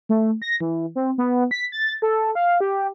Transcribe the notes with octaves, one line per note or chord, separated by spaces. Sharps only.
A3
A#6
E3
C4
B3
B6
A6
A4
F5
G4